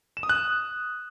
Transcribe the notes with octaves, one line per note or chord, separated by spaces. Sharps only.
E7
D#6
F#6